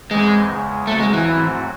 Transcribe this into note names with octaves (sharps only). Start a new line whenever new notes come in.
F#2 E3 G#3 C4 D#4
E2 C#3 G#3
E2 C#3 F#3 A3 C4 F#4
G#3
E3
G#2 F#3 A3 C4 F#4